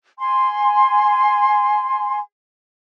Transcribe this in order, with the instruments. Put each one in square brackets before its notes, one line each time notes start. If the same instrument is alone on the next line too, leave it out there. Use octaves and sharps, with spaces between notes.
[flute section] G#5 C6